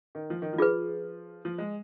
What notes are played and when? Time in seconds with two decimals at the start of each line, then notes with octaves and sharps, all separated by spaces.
0.15 D#3
0.30 F3
0.42 D#3
0.53 F3
0.58 F4 G#4 B4
1.45 F3
1.58 G#3